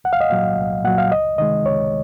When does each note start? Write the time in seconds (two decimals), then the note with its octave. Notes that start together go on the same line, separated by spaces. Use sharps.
0.04 C2 F#5
0.13 F5
0.21 D#5
0.30 A#2 F#3 F5
0.57 C2
0.84 A#2 F#3 F#5
0.98 F5
1.12 C#2 D#5
1.38 C3 D#3 G#3 D#5
1.65 C#2 C#5